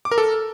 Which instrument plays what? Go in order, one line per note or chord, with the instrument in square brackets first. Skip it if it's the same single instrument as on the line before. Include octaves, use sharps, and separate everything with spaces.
[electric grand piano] D6
A#4
A4